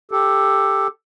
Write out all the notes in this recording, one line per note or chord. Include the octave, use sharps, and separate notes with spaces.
G4 A4